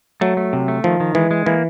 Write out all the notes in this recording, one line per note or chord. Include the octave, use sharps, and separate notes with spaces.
F#3 A3
A3
C3
A3
D#3 F3
D#3
E3 G#3
G#3
E3 A#3